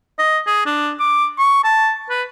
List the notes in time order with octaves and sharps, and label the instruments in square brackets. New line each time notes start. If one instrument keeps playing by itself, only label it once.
[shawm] D#5
G#4
D4
D6
C#6
A5
B4